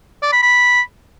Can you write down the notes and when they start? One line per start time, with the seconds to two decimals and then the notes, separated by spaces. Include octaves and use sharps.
0.22 D5
0.32 B5
0.42 B5